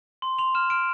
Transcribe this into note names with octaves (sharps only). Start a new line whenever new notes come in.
C6
C6 F7
F6 E7
F6 D7